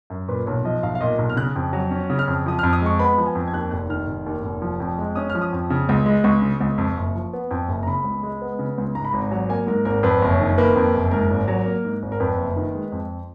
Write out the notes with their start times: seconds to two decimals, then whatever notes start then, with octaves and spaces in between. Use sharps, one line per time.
0.10 F#2
0.28 A#2 B4
0.46 B1 C#5
0.64 F3 D#5
0.83 B1 F5
0.95 F5
1.01 A#2 D#5
1.19 B1
1.29 F6
1.36 C#3 F#6
1.56 F2
1.73 F#3
1.91 C#4
2.10 C#3
2.19 F6
2.28 F2
2.46 F3 D#6
2.59 F6
2.63 F2
2.73 D#6
2.82 G#3 C#6
2.99 B3 B5
3.18 F3
3.26 G#5
3.35 F2
3.48 G#6
3.53 D#2 F#6
3.71 F1 F#6
3.90 D#3 F6
4.07 F1
4.26 D#2
4.43 F1
4.62 F3
4.80 F2
4.98 G#3
5.16 C#4 D#6
5.30 F6
5.35 F3
5.42 D#6
5.53 F2
5.70 C#3
5.89 C#2
6.06 G#3
6.24 C#2 C#6
6.42 C#3
6.61 C#2
6.78 F2
6.97 F#1
7.15 F3
7.33 B3
7.51 F2
7.68 F#1
7.83 A#5
7.87 C#3 B5
8.04 C#2
8.23 G#3
8.41 B3
8.59 C#3
8.78 C#2
8.95 G#2 A#5
9.05 B5
9.13 G#1 A#5
9.31 F#3
9.49 A#3 G#5
9.67 G#2 A#4
9.85 G#1 A#4
10.03 F2 B4
10.22 F#1
10.31 C#5
10.40 D#3
10.58 A#3 B4
10.76 F2
10.94 F#1
11.11 G#2 A#4
11.30 G#1
11.48 F#3
11.66 A#3
11.85 G#2
12.03 G#1
12.12 A#4
12.20 F2 B4
12.38 F#1
12.56 D#3
12.75 G#3
12.92 F2